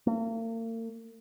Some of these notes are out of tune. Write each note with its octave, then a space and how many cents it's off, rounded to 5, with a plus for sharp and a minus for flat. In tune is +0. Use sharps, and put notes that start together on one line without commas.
A#3 -45